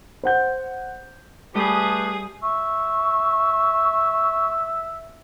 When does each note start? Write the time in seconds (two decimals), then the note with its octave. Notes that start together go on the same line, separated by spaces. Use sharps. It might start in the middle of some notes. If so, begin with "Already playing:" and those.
0.23 C5 F#5 G6
1.55 G3 A3 G4 G#4 B4 D#6
2.43 E5 C#6